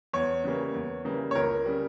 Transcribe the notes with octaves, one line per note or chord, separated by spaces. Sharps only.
E2 C#5
C#3 E3 G3 A#3
E2
C#3 E3 G3 A#3
C#5
C#2 A#4
C#3 G3